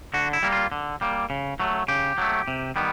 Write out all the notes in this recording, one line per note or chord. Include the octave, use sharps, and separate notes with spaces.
D3 F#4
E4
G3 A#3
F4
D3
G3 A#3
C#3
F#3 A3
C#3 G4
F#3 A3
C3
D#3 G3 B3